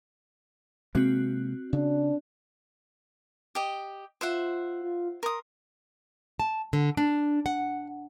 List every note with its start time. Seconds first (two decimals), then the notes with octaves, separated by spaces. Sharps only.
0.95 C3 G#3 A#3 C4 F#4 F#6
1.73 C#3 D4
3.55 G4 D#5
4.21 F4 C5 E5 F#5
4.83 F4
5.23 A#4 C6 D#6
6.40 A5
6.73 D3
6.97 D4
7.46 F#5